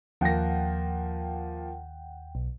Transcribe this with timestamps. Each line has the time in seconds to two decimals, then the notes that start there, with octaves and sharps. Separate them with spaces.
0.21 D#2 F3 A#3 F#5 G5 A#6
2.35 B1